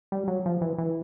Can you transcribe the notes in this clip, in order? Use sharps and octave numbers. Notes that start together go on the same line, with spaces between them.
G3
F#3
F3
E3
E3